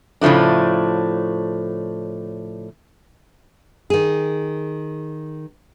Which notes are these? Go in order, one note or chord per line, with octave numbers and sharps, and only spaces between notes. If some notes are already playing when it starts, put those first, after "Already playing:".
A2 C#3 F3 A3 D4
D#3 G#4